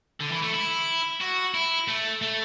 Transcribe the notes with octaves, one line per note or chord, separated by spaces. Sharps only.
D3
E3
A3
E4
F#4
E4
A3
A3